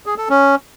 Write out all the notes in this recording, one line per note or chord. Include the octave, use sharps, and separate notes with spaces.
G#4
A4
C#4